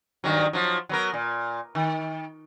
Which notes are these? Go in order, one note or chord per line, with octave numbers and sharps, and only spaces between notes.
G2 D#3 F#3
F3 F#3
F#3 B3 A#4
A#2
D#3